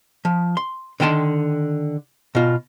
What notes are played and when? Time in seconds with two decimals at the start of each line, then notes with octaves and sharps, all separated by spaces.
0.25 F3
0.57 C6
1.00 D3 D#3 G5 A5 C6
2.35 B2 F4